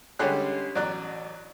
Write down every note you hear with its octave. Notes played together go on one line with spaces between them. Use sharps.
D3 G3 G#3 C#4 G4 F#6
A1 F#3 D5 F#6